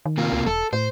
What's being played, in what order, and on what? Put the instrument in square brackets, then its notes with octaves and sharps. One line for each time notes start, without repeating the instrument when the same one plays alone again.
[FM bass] D#3
[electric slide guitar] C3 A#3 F4
[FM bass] C#2
[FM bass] E1 [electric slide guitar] A4
[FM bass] A2 [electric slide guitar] C5